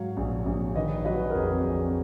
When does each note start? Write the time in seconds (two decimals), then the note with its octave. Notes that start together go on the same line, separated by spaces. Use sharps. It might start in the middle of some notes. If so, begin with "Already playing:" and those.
Already playing: G#2 F#3 C#5 F5
0.17 A#1
0.46 A#1
0.75 D#3 B4 D#5
1.05 F#3 B4 D#5
1.30 A#4
1.35 F2 G#4 B4
1.64 F2